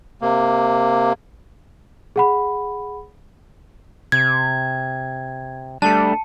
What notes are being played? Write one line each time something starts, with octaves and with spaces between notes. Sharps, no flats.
C3 A#3
G#4 F#5 B5
C3 G#6
G3 A3 D4 A5 C#7